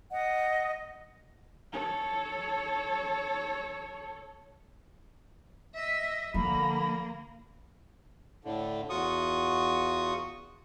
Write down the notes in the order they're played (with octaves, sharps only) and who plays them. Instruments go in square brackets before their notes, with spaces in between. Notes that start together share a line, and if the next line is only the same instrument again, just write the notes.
[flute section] D#5 F#5
[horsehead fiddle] A4 C#5
[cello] D#5 E5
[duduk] D3 [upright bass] F3 [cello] A#3 [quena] B5
[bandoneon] A2 D3
E2 F4 F#4 C#6 D#6